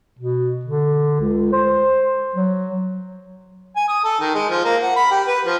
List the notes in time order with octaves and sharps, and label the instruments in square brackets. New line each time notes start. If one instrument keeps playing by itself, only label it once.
[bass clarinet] B2
D3
C#2
C5
F#3
[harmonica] G#5
D#6
A4
D#3
G#3
F3
A#3
F#5
B5
G4
B4
F3